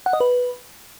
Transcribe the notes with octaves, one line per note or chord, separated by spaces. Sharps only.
F#5
D#5
B4